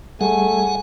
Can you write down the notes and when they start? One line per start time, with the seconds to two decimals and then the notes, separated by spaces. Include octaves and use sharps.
0.21 G3 A3 G#4 A4 F#5 G#5